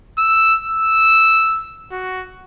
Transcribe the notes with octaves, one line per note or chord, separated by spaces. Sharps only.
E6
E6
F#4